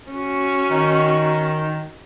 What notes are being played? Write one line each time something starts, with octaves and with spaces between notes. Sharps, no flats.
C#4 F#4
D#3